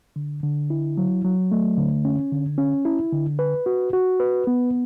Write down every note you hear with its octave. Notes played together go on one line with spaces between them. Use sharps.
D3
D3
E4
F#3
F#3
A3
D3
C#4
D3
C#4
E4
D3
B4
F#4
F#4
B4
B3